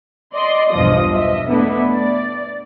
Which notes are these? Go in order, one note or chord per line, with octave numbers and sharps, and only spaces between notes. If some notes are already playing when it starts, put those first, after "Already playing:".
D5 D#5 C6
B1 E2 G2 F3 D#5 D#6
D#5 E5
A3 B3 D4 E4 A4
D5